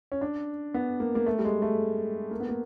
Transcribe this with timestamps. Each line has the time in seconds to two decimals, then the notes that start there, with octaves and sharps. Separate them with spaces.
0.12 C#4
0.21 D4
0.74 B3
1.00 A#3
1.15 A#3
1.26 A3
1.39 G3
1.45 G#3
1.62 A3
2.31 A#3
2.40 B3
2.49 A#3